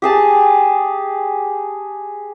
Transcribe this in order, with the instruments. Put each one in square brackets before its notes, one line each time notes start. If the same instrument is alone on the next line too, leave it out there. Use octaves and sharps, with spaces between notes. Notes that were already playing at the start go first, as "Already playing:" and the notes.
[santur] G4 G#4 A5